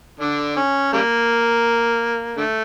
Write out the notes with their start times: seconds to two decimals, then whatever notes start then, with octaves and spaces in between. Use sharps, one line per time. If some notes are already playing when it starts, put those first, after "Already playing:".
0.20 D3 D4
0.56 C#4
0.93 C#3 G3 A#3
2.37 D3 A3